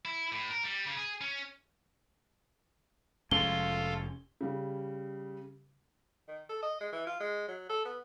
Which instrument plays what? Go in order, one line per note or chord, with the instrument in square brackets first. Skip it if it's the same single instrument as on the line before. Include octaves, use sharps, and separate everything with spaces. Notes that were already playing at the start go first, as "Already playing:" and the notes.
[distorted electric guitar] E4
A2
A#4
G3
C#3
G#4
C#4
[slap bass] F1 G#3 C#4 [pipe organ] F4 A4 F5 [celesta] G7
[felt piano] C#3 G3
[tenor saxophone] D#3
A4
D#5
G#3
E3
F4
G#3
F#3
A4
B3